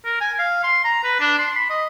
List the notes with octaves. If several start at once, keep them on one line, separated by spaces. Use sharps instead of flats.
A#4
G#5
F5
C6
A#5
B4
D4
C6
B5
D#5